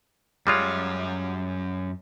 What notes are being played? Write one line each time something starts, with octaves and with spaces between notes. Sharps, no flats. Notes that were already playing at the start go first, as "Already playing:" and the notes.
F#2 G3 G#3 F4 C#5